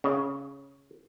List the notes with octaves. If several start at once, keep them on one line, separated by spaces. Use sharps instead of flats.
C#3